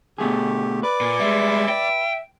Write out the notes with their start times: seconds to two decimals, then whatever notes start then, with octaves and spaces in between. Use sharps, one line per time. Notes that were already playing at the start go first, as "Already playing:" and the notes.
0.18 B2 D3 A3 G4 G#4
0.83 B4 D5 D6
1.01 A#2
1.20 G3 G#3 E5
1.69 G5